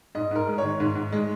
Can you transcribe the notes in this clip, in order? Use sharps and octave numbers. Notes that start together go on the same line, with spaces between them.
G#2 D#5
G#2 A#4
G#3
D#3 C#5
G#2
G#2
G#3